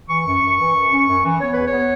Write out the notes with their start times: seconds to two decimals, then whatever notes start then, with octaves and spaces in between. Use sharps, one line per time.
0.09 E3 C#6
0.26 F#2
0.41 F#2
0.59 E3
0.75 F#2
0.91 C#4
1.08 F#2
1.24 E3
1.40 B3 C#5
1.53 E2 B4
1.65 C#5
1.72 B3